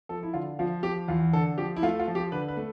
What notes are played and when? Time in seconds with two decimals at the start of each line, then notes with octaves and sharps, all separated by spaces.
0.09 F3 A4
0.23 E4
0.34 D3 F4
0.59 F3 F4
0.83 F3 G4
1.08 E2 F4
1.33 D3 A4
1.58 F3 G4
1.76 E4
1.82 A3 F4
1.99 F4
2.08 F3
2.15 G4
2.32 D3 B4
2.48 B4
2.57 A3